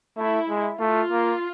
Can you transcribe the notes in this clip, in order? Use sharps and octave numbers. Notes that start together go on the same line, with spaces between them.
A3 E4
G#3
A3 F4
A#3